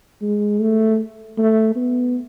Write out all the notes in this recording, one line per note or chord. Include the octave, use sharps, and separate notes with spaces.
G#3
A3
A3
B3